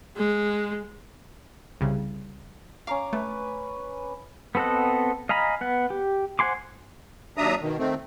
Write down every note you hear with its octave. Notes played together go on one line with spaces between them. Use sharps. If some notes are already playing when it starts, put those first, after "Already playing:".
G#3
C2 C#3
C#4 F5 A#5 D6
A3 B4
B3 C4 A4 D#5 F#5
D#5 F5 G#5 A#5 B5
B3 F#5
G4
C5 F#5 G#5 C6 D6
D#2 F#3 D4 E5 A#5 D#6
B2 D#3
D#3 A3 C4